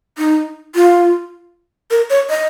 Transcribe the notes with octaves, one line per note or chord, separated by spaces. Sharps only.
D#4
F4
A#4
C#5
D#5